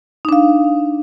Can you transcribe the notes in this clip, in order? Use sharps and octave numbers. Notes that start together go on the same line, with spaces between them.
D4 D#4 F5